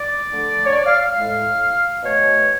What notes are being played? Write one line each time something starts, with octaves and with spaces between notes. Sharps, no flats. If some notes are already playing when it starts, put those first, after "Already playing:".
Already playing: D5
D3 F3 A3
C#5
D5
F5
F5
A2 G#3
B2 A3 C#5